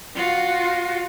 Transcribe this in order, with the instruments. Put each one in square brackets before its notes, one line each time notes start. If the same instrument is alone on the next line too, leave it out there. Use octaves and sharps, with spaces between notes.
[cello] F4 F#4